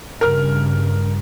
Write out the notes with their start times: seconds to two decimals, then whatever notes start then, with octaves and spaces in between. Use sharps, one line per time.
0.21 G2 C#3 A#4 F6